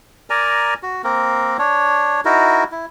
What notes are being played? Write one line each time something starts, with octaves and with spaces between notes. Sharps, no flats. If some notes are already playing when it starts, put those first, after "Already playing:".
A#4 D5 G#5 A#5
F#4
A#3 C4 A#4
D4 C#5
D#4 E4 F#4 A#4
E4